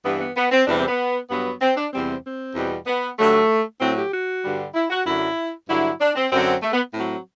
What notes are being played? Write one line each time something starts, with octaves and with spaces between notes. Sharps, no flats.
G2 E3 G3 B3
B3
B3
C4
E2 C3 E3 G3 D4
C4
B3
G2 F#3 B3
C4
D4
E2 C3 G3 C4
C4
E2 B2 G3
B3
G2 D3 F#3 A3
A2 F#3 C4
G4
F#4
G2 D3 G3
E4
F#4
F#2 D3 F#3 E4
G2 D3 F#3 E4
D4
C4
F#2 D3 F#3 C4
A3
B3
A2 F#3 C4